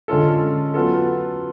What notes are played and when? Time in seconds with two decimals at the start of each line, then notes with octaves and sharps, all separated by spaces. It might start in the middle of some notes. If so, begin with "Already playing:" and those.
0.08 D3 G#3 C#4 F4 A4
0.74 F#3 B3 F4 A4